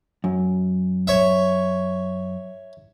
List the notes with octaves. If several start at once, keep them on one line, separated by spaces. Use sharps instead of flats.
F#2
C#5 E5